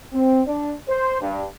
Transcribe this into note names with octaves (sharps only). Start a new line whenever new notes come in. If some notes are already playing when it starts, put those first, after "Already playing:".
C4
D4
C5
G2